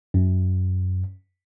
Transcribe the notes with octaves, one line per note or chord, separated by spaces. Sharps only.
F#2